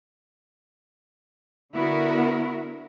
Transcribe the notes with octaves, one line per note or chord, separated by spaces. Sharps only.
D3 B3 E4 F#4 A#4